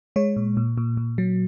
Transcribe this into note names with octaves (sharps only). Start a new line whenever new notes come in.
G#3 C#5
A#2
A#2
A#2
A#2
F#3